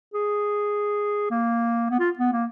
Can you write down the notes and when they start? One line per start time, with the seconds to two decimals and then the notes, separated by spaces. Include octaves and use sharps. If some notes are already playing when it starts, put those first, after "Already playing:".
0.14 G#4
1.31 A#3
1.90 B3
2.00 F4
2.19 B3
2.32 A#3